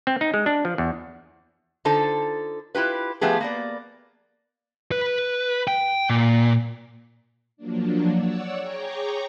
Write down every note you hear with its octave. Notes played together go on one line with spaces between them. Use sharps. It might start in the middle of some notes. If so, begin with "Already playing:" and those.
C4
D#4
G#3
D4
F3
E2
D3 D#4 F4 A4 C5 A5
E4 F4 G4 B4
F3 A3 B3 G4 G#4
A#3 B3 D5
B4
G5
A#2
F3 F#3 A#3 D4
C#5 D5 F#5 E6
G#4 C#5 G5 A#5 C#6 D6